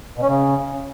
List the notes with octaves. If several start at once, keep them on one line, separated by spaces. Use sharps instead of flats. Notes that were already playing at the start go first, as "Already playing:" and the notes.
B2
C#4
C#3